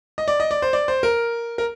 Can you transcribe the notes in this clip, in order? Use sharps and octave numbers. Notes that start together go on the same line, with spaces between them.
D#5
D5
D#5
D5
C5
D5
C5
A#4
A#4